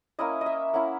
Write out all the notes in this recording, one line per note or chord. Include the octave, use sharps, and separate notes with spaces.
A#3 C#4 E4 D#5
D#5
E5
A#3 C#4 E4 F#5